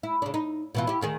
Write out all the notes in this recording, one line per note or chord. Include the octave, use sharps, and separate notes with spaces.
E4
C#3 D4
D#4
B2 E3 F4
E4 G4
D2 D#3 G#4